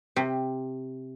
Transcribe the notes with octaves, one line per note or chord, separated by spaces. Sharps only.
C3